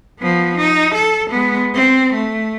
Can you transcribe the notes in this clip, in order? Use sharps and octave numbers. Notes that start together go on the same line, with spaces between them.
F3 B3
D#4
A4
G#3 B3
C4
A3